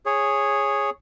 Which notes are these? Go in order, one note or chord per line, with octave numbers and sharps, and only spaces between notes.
G#4 C#5